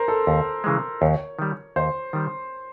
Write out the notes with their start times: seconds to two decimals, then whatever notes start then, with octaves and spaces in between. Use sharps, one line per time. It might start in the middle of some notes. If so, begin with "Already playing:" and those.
Already playing: A#4 C5
0.08 A4
0.27 D#2
0.64 C#3 E3 G#3
1.01 D#2 C#5
1.39 D#3 G3
1.76 D#2 C5
2.13 D#3 G3